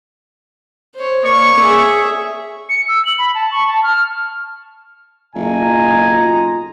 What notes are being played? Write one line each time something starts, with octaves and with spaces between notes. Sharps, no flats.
C5 C#5
A#3 C#5 D5 C#6
G#4 E5
C#7
E6
F#7
B5
A5
C#6
A5
F6
F#1 B1 F4 D#5 G#5 A#5